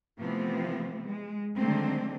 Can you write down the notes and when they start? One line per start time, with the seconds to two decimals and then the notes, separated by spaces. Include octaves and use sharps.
0.18 C3 E3 F3 A3 B3 C4
1.05 G#3
1.56 D3 D#3 F#3 G#3 A3 C4